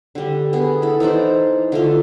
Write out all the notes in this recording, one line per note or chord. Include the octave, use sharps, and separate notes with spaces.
D3 G3
B3 G#4
E4 A4
E3 D#4 C5 D5
D3 A3 F4